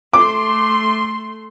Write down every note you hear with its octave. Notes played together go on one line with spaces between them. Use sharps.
A3 C6 D6